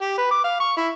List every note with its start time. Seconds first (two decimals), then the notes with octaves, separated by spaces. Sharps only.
0.01 G4
0.18 B4
0.31 D6
0.44 F5
0.60 C#6
0.77 E4